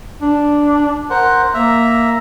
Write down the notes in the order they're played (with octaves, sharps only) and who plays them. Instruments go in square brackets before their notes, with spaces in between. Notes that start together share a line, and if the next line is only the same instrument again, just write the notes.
[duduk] D4
[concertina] A#4 C5 F#5
[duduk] A#3 [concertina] E5 A#5